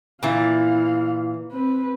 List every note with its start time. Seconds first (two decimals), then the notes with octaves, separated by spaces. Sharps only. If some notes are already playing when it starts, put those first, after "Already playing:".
0.23 A#2 E3 E4 F5
1.52 C4 B4